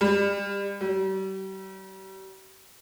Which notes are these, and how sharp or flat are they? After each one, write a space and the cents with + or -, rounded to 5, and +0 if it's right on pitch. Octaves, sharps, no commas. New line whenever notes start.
G3 +30
G3 -40